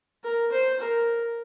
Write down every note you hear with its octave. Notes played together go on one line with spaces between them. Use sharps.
A#4
C5
A#4